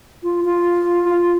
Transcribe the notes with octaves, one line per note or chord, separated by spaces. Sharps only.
F4
F4
F4